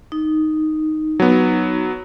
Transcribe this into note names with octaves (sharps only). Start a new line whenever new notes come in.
D#4
F#3 B3